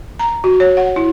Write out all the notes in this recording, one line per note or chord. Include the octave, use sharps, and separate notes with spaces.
A#5
F#4
C#5
F#5
E4